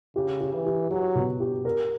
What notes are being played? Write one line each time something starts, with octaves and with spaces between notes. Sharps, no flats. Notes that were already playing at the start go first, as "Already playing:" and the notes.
C#3 G4
G4
E3
G4
F#3 G4
B2
G4
A#4